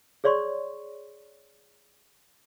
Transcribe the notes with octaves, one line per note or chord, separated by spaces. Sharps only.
G#4 C#5 D5 C6 C#6